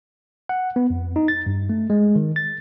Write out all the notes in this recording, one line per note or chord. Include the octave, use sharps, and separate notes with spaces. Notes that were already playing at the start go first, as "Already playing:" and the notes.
F#5
B3
F2
D#4
A6
G2
A3
G#3
D#3
A6